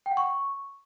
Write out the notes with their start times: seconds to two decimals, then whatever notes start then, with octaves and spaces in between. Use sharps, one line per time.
0.06 G5
0.11 F#5
0.17 C#6